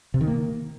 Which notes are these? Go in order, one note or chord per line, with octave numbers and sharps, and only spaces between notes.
C3
D#3
A#3